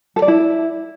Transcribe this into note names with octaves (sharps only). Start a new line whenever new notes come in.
A4
D5
E4